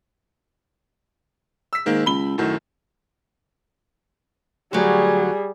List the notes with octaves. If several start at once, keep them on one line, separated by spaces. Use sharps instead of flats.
E6 B6
G#2 D#3 A#3
C#2 B5 G7
F#2 A2 D#3 F#3
D2 F#3 G3 G#4